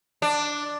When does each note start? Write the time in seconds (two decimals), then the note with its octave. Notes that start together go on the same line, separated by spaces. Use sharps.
0.22 D4